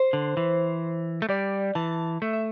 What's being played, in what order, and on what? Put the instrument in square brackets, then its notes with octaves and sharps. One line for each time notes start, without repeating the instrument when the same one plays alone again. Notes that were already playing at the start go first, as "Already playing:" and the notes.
Already playing: [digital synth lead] C5
[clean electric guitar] D3
E3
A3
[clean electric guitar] G3 [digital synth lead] D5
[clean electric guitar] E3 [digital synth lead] A5
[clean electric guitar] A3 [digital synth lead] E5
[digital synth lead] E5